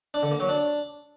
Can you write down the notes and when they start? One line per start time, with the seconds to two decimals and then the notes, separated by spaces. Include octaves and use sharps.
0.14 D4
0.23 D3
0.31 A#3
0.40 F#3
0.49 D4